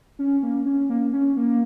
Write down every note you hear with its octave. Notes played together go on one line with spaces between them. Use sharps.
C#4
A#3
C#4
A#3
C#4
A#3